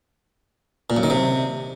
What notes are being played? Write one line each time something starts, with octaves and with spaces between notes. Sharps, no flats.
A#2
F#2
D#3
C3